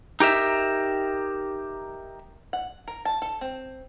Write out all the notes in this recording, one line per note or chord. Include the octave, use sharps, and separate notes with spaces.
D#4 G4 A#4 E5
F#5
A#4
A5
A4
C4